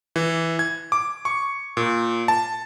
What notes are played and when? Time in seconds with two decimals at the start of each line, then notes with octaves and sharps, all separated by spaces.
0.16 E3
0.59 G#6
0.92 D6
1.25 C#6
1.77 A#2
2.28 A5